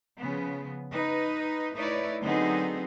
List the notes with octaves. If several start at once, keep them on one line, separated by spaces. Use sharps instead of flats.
C#3 F3 B3
D#4 B4
A3 D#4 E4 B4 C#5 D5
D3 F#3 B3 C4 D#4 G#4